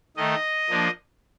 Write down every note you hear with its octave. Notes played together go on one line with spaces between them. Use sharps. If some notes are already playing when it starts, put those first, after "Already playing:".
D#3 A3 D#4 D#5
F3 A#3 D4